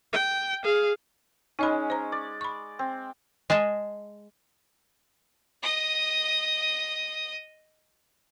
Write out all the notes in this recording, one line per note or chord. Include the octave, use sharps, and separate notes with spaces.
G5
G#4 F5
G#3 C#4 D#4 D#5 B5
C5 A#5
D5
B5 C#6
C4
G#3 G#4 D#5 A5
D#5 D#6